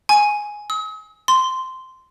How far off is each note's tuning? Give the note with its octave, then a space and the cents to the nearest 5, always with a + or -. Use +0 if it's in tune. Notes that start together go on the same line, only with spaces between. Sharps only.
G#5 +5
D#6 +45
C6 -10